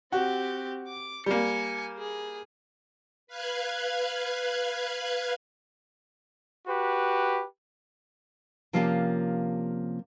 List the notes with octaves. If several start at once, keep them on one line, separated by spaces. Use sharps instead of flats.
C4 F#4 G4
D6
G3 A#3 G#5 C#7
G#4
B4 F5 F#6 G#6
F#4 G4 B4
C3 F3 A#3 C#4 F4 G4